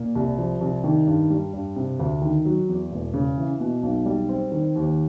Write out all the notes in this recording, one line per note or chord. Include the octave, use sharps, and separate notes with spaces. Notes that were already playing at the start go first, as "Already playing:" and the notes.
Already playing: A#2
C2
F3
C2
D#3
G2
G3
G2
C3
D2
D#3
F#3
E2
E1
C#3
E3
B2
B1
G3
C4
D#3
D#2